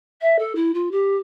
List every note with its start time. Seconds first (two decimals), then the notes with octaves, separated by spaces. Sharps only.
0.21 E5
0.39 A4
0.55 E4
0.74 F4
0.91 G4